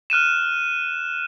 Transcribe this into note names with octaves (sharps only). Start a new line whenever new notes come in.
F6 F#6 D#7 E7